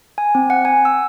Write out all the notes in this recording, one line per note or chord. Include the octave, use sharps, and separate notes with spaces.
G#5
C4
F#5
G#5
E6